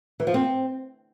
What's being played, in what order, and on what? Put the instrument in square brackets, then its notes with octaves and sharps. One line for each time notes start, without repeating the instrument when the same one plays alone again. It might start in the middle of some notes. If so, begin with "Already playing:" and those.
[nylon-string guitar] E3
F3
C4